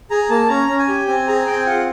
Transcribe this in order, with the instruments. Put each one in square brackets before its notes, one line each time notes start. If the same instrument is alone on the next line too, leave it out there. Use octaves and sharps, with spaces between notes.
[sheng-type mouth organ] G#4 A#5
A#3 A5
C#4 A#5
C#4
G#5
G4
C4 G#5
G#4 A#5
C4 G5
F4 F#5